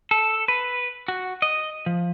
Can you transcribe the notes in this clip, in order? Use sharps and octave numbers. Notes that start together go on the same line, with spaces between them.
A4
B4
F#4
D#5
F3